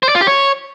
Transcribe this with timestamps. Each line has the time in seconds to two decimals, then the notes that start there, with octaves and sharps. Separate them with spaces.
0.03 C5
0.09 D5
0.15 F4
0.21 G4
0.27 C#5